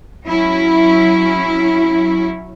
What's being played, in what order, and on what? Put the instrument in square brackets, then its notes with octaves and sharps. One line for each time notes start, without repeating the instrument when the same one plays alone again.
[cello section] F#3 C#4 E4